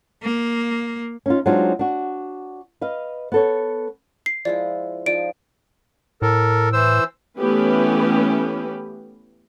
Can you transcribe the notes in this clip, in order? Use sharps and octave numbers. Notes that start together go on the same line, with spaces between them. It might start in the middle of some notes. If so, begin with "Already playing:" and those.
A#3
C#4 D#4 F4
F#3 G#3 C4 D4 D#4 F4
D4 F#4
B4 D#5 F5
B3 A4 C#5
C7
F3 G#3 E4 D5
F3 D#4 D5 D7
A2 A4 A#4
E3 C5 E6
E3 A3 B3 C#4 G4 B4